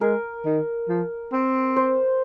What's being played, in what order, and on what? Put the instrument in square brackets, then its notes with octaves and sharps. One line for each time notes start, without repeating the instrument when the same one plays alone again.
[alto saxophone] G#3 [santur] A#4
[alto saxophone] D#3
F3
C4
[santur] C5